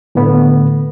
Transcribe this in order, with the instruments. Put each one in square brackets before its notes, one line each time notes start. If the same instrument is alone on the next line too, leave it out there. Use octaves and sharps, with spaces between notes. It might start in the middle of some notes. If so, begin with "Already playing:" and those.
[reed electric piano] A2 D3 A3 B3